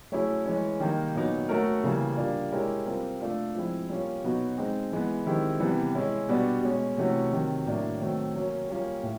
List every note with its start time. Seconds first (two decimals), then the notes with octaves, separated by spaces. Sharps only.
0.12 F#3 A3 C#4 E4 G#4
0.46 E3 G#3 C#4
0.80 D#3 G3 A#3 D#4
1.14 A#2 F#3 B3 D#4
1.49 A3 C#4 F#4 A#4
1.84 C#3 E3 G3 A#3
2.17 G3 A#3 D4 F4
2.52 G#3 C#4 E4 G4 A#4
2.86 G3 C4 F4 A#4
3.21 A3 D4 F4
3.55 F3 G#3 C4 E4
3.89 G3 A#3 C#4 F4
4.23 B2 F#3 B3 D#4 F#4
4.57 G#3 C4 D#4
4.92 E3 G#3 B3
5.26 D#3 G#3 C4 E4 G4
5.60 C3 E3 G3 B3
5.95 G#3 C#4 E4
6.28 B2 G3 B3 D4 F#4
6.63 B2 G#3 C#4
6.97 C3 E3 A3 C#4 F#4
7.31 C3 D#3 F#3
7.66 A2 F#3 A#3 D4
8.01 D#3 F#3 A3 C4
8.35 F#3 A#3 C#4
8.69 G3 A#3 C#4 F4
9.03 A2